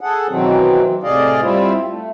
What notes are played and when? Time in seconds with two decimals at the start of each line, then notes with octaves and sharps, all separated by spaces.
0.01 G#4 A4 F#5
0.29 B2 D#3 E3 F#3 C4
1.03 A2 C3 G#4 D5 D#5 F5
1.42 G3 C4 E4 F4
1.88 A3